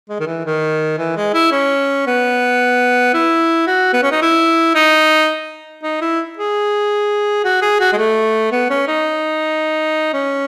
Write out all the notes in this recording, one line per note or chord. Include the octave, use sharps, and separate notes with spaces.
G#3
D#3
E3
D#3
E3
G#3
E4
C#4
B3
E4
F#4
B3
C#4
D#4
E4
D#4
D#4
E4
G#4
F#4
G#4
F#4
G#3
A3
B3
C#4
D#4
C#4